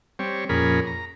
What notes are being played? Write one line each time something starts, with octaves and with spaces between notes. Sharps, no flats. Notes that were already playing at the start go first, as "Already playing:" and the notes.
G3 C4 C#5
F2 A#2 C#4 G#4 A#4 B5
A#5